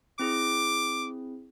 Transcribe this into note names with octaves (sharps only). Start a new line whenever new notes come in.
C4 E4 G#4 D6